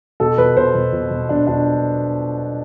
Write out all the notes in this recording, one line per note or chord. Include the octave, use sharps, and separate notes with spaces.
B2 A4
B2 B4
B2 C5
B2
B2
B2
B2 D4
B2 D4